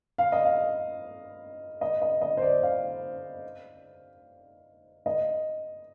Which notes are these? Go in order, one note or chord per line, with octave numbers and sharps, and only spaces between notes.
F5
D#5
F5
D#5
D#5
D#5
C5
D5
F5
D#5